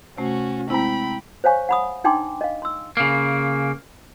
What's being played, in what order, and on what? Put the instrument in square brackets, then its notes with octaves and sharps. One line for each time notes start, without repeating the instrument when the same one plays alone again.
[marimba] C3 A3 [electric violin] C#4 F#4
[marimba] G#3 E4 [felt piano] C4 A#5 [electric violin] G5 B5
[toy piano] C5 C#5 F5 G#5 C#6
F#5 B5 D#6
D4 D#4 G5 G#5 C6 D6
D#5 F5
C6 E6
[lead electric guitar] C#3 A#3